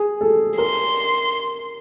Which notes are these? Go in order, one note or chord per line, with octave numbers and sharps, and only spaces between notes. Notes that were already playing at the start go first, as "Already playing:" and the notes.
Already playing: G#4
A4
A#4 C6